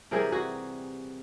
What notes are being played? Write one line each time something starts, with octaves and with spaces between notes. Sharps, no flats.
C3 E3 G3 G#4 A#4
F#4 G#4